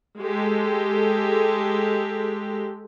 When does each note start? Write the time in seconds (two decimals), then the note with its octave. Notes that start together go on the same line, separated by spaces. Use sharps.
0.19 G#3 G4 A4